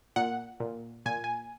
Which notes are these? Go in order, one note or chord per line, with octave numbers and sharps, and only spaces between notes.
A#2 F#5
A#2
A#2 G#5
G#5